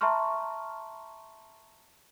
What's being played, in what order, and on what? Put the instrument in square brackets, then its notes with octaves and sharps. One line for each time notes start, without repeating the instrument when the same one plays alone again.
[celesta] E5 A5 A#5 C6 C#6 F6